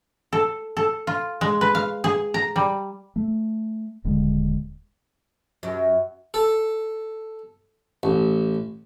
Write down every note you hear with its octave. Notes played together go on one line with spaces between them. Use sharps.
A4
A4
F4
G#3
B4
F5
G#4
A#5
G3
A3
D#1 D3 G#3
F#2
A4
A1